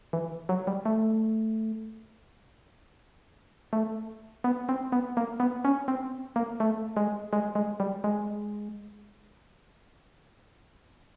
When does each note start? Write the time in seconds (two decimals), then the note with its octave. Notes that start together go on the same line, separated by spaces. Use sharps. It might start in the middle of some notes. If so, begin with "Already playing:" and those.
0.13 E3
0.49 F#3
0.67 G3
0.86 A3
3.73 A3
4.44 B3
4.69 C4
4.92 B3
5.17 A#3
5.40 B3
5.65 C#4
5.88 C4
6.36 A#3
6.60 A3
6.97 G#3
7.33 G#3
7.55 G#3
7.80 G3
8.04 G#3